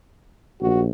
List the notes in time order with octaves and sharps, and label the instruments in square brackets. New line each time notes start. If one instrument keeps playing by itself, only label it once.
[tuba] A#1 [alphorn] F#4